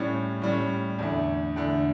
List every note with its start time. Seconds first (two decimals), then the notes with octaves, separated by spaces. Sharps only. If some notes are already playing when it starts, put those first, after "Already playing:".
Already playing: A2 G3 C#4
0.42 A2 G3 C#4
0.98 E2 D3 A3
1.56 E2 D3 A3